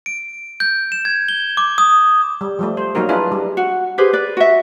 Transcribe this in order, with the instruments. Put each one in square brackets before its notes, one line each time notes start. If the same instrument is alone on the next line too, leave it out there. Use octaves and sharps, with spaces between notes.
[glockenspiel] D7
G6
E7
G#6
G7
D6
D#6
[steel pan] G3
F3 G3 A3
C5
F#3 A#3 D#4 F#4 A#4
D4 E4 F4 G#4 B4
G3
[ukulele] F#4
G4 G#4 B4 C5
B4 D5
F#4 E5